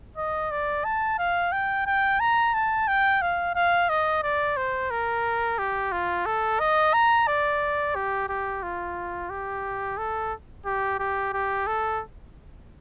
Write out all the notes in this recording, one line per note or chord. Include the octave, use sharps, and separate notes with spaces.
D#5
D5
A5
F5
G5
G5
A#5
A5
G5
F5
F5
D#5
D5
C5
A#4
G4
F4
A4
D#5
A#5
D5
G4
G4
F4
G4
A4
G4
G4
G4
A4